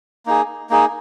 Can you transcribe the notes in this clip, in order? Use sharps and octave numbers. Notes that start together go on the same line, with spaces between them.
A#3 D#4 G#4
A#3 D#4 G#4